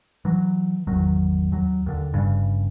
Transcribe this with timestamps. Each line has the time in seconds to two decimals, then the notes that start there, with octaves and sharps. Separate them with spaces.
0.25 E3 F#3
0.87 G#1 E2 D#3 F#3
1.52 D#2 F#3
1.86 D#2 D3
2.13 G1 G2 C#3